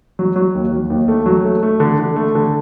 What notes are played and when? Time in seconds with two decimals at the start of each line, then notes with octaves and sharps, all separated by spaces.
0.19 F#3
0.36 F#3
0.55 D#2
0.72 F#3
0.90 D#2
1.08 A3
1.26 F#3
1.44 A3
1.63 A3
1.80 D3
1.99 D3
2.16 A3
2.35 D3